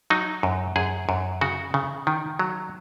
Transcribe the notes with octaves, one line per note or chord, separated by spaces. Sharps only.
F#3 D#4
F#2
F#2 G#4
F#2
C#3 F#4
C#3
D#3
F#3